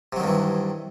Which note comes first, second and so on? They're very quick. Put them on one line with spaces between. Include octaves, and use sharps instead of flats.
C3 F#3 D#3 G2 E3